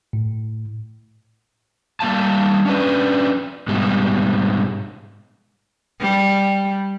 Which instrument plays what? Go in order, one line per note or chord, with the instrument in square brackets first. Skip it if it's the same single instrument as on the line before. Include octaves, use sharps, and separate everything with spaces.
[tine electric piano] A2
[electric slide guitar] G3 A#3 F5 A5
C#4 D4 B4
G#2 B2 G3
[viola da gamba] G3